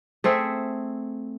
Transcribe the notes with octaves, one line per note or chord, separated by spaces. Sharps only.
A3 C4 G#4 E5